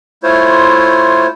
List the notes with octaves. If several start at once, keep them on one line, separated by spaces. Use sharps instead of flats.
A3 E4 F4 C5 C#5